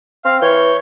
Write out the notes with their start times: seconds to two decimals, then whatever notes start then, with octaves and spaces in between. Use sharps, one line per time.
0.25 C4 F5
0.42 E3 C#5 G6